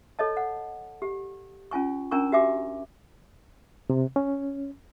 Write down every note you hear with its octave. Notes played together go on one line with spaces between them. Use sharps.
A4 C#5 D#5 A5
F#5
G4
C#4 F4 G#5 C#6
C#4 D4 A#4 G#5 A#5 C#6
F#4 G4 E5 G#5 D6
C3
C#4